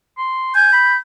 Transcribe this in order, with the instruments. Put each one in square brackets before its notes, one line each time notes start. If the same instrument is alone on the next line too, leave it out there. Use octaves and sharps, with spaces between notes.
[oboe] C6
[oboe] G#5 [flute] G6
[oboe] B5